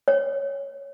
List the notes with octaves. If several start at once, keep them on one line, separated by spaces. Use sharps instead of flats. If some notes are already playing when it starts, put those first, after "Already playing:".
C#5